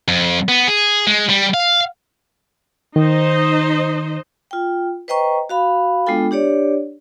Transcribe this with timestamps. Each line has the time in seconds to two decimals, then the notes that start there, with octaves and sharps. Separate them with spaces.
0.08 F2
0.49 B3
0.67 G#4
1.07 G#3
1.30 G3
1.54 F5
2.96 D#3 D#4 C5 D#5
4.51 F4 G5
5.08 B4 C5 D#5 G5 A#5 C#6
5.49 F#4 F5 B5
6.06 G#3 B3 D4 F4 A4 G5
6.31 D4 G4 C#5 D5